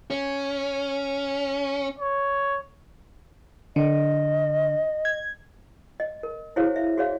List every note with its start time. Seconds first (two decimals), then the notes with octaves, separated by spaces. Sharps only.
0.11 C#4
1.99 C#5
3.76 D3 D#5
5.05 G#6
6.00 D#5
6.23 A#4
6.56 E4 F#4 G#4 C5 C#5 F5
6.76 E5
6.97 F#4 G#4 C#5 D5 F5